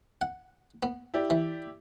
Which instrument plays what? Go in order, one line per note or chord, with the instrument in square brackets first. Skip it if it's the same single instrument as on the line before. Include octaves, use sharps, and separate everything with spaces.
[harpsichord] F#5
B3
[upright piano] E4 G4 D5
[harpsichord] E3